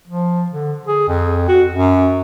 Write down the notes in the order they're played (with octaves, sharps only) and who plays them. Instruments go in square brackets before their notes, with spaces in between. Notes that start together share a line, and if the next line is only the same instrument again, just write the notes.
[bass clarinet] F3
D3
G#4
F2
F#4
F#2